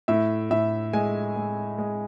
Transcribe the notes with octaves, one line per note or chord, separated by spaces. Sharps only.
A2 E5
A2 E5
G#3 G#5
G#3
G#3